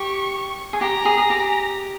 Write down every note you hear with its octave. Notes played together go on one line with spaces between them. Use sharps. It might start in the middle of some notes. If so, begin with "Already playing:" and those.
Already playing: G4 C#6
G#4
G4 A#5
G#4
G#4
G4